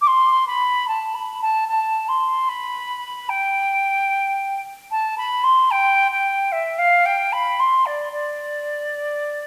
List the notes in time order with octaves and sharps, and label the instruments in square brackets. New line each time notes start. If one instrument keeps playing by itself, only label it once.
[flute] D6
C6
B5
A5
B5
A5
A5
C6
B5
G5
A5
B5
C6
G5
G5
E5
F5
G5
B5
C6
D5
D5